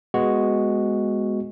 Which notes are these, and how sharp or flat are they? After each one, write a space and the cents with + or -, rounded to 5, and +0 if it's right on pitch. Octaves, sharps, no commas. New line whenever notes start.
G#3 +0 B3 -5 F#4 +0